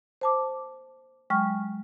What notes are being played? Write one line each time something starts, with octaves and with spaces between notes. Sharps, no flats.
C5 A5 D6
F#3 G#3 G5 C#6 F6